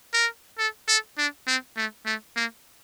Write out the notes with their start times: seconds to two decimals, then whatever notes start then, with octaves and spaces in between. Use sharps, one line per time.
0.13 A#4
0.58 A4
0.88 A4
1.18 D4
1.47 C4
1.76 A3
2.05 A3
2.36 A#3